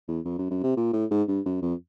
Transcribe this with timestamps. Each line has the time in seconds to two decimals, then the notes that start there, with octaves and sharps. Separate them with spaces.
0.08 E2
0.25 F2
0.39 F#2
0.51 F#2
0.64 C3
0.77 A#2
0.93 A2
1.11 G#2
1.28 G2
1.45 F#2
1.62 F2